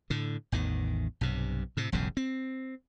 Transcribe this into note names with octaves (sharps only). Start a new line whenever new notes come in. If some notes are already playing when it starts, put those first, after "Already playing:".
A2 D3
A1 E2 D#3
B1 G2 C3
A2 C3
E1 B1 G2 C#3
C4